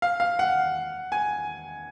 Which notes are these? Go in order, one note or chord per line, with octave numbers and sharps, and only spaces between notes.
F5
F5
F#5
G#5